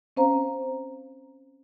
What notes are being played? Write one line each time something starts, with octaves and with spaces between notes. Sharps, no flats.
C4 C#4 C5 F5 A#5